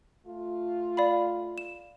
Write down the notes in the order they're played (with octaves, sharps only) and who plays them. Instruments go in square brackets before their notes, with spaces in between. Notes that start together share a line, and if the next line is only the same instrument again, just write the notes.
[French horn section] A3 F4
[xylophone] D5 F5 B5
E7